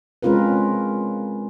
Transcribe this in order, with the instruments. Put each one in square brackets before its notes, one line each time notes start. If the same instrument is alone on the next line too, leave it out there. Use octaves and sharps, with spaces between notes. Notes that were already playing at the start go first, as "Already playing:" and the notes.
[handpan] G#3 C4 C#4 F4 A#4 B4